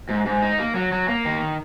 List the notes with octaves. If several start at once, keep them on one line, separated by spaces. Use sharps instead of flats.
G#2
G#2
D#4
A#3
F#3
F#3
A#3
D#3